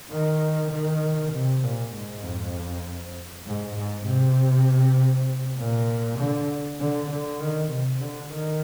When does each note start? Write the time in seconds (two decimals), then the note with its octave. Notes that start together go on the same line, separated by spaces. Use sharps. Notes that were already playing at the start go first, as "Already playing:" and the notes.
0.11 D#3
0.72 D#3
1.32 C3
1.63 A#2
1.94 G#2
2.23 F2
3.46 G#2
3.76 G#2
4.06 C3
5.58 A#2
6.19 D3
6.80 D3
7.11 D3
7.41 D#3
7.71 C3
8.01 D3
8.32 D#3